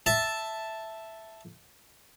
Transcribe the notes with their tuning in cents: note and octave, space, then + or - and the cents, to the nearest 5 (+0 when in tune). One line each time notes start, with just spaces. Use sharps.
E5 +0 A5 +0